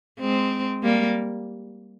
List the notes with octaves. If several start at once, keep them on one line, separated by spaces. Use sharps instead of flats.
G#3 C4
G3 A#3